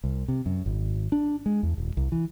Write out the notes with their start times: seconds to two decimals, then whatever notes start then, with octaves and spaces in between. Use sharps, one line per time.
0.04 C2
0.28 C3
0.46 F#2
0.66 G#1
1.12 D4
1.46 G#3
1.63 E2
1.78 D#1
1.97 C2
2.12 E3